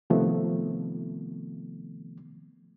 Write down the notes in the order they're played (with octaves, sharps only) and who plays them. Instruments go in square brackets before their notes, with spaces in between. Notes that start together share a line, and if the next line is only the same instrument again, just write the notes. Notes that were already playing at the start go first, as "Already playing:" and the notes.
[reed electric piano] C3 D#3 F3 A3 B3